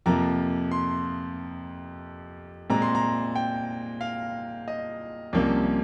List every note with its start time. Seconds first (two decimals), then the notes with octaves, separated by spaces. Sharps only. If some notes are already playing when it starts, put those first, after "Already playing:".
0.06 F2 C3 F3 A#3 A#5
0.71 C6
2.70 A#2 G#3 C4 A#5
2.82 C6
2.95 A#5
3.35 G5
4.01 F5
4.68 D#5
5.33 C2 C3 F3 A#3 C#4